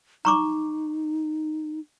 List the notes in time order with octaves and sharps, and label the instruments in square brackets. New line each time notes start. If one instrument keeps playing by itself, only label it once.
[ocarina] D#4 [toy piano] A#5 C#6 D6